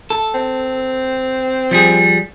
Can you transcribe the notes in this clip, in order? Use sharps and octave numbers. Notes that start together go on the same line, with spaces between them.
A4
C4
F3 G3 G#4